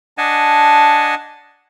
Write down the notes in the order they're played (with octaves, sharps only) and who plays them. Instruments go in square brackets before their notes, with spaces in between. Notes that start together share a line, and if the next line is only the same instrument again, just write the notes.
[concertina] D4 D#5 F#5 G#5 A5